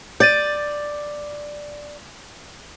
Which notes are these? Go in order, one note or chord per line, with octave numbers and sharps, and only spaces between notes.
D5 G6 A6 D#7